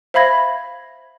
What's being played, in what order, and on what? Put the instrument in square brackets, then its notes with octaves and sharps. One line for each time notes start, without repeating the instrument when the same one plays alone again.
[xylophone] C5 E5 F5 B5 G#6 A#6